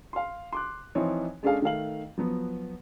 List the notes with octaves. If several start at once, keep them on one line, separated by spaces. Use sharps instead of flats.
F5 C6
C6 D6 F#6
E3 F3 C4 D#4 F4 C#5
G#3 C#4 D4 G#4 A4 F5
D#3 A3 F5 F#7
F3 F#3 B3